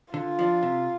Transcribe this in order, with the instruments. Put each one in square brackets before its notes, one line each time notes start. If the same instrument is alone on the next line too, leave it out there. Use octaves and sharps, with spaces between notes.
[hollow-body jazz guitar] D3 [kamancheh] F4
[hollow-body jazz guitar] F3 D4
C3